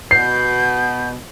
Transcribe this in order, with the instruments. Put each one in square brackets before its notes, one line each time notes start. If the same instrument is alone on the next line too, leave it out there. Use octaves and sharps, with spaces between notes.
[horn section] B2 [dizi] G6 [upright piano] C7